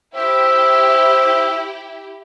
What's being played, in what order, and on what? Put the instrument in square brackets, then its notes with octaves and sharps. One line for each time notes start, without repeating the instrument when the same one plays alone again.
[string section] E4 G4 [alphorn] C5 [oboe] E5